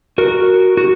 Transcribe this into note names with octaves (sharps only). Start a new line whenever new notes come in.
F#4 A#4
F#4